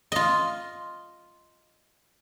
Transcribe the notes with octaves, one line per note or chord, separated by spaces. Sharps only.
F4 D#5